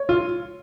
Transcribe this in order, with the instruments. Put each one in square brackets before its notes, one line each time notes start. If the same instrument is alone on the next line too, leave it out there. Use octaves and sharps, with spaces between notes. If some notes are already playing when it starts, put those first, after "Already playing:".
Already playing: [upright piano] C#5
[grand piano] F4